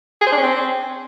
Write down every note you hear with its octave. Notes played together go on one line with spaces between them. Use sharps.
G#4
C5
D4
C#4
C4